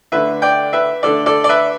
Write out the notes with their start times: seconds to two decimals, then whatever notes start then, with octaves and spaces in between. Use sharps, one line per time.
0.12 D3 A3 D4 B4 E5
0.42 D5 G5
0.73 B4 E5
1.03 D3 A3 D4 A4 D5
1.26 A4 D5
1.44 D5
1.49 B4 E5